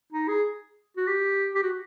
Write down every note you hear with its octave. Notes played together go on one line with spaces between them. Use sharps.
D#4
G#4
F#4
G4
G4
F#4